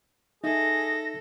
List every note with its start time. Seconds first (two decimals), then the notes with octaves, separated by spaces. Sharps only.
0.44 D#4 G#4 A4 E5 A#6